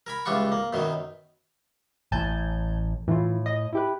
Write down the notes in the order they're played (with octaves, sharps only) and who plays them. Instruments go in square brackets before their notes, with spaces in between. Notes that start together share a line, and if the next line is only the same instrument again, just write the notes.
[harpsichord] A#4 G#5 B5
C#2 E3 G3 F4 F#5 C#6
A#3
F#2 B2 D#3 F#3
[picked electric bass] A1 A2 [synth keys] G#5 A5 G6
[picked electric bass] A2 [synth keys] E3 F4
[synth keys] D#5
E4 G4 B4